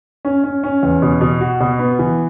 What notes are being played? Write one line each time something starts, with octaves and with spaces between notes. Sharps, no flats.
C#4
C#4
C#4
E2
B2
B2
F#4
B2
B3
E3